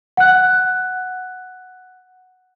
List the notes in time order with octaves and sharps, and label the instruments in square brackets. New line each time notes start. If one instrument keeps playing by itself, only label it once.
[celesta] F#5 F#6